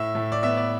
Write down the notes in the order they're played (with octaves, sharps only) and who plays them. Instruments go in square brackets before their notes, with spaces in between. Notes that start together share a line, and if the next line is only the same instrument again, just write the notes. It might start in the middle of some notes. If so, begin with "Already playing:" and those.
Already playing: [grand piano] A2 E5
A2
D5
B3 E5
D5